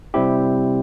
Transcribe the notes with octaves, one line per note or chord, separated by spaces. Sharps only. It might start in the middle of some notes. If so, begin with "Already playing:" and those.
C3 G3 C4 E4 G4